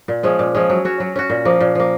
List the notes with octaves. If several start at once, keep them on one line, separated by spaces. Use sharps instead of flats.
A#2
F3 G#3 C#4
A#2
F3 G#3 C#4
F#3
C#4 F#4
F#3
C#4 F#4
A#2
F3 A#3
A#2
F3 A#3